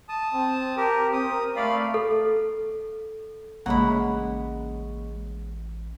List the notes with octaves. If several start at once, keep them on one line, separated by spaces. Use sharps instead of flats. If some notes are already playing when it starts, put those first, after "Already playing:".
A5 D#6
C4
G4 A#4
C4 D#6
A#4
A3 D5 F5 B5
A4
A1 C#3 G#3 A#3 C#4 F#5 A#5 B5